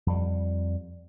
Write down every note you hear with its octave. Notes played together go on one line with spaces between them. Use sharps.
F2 G3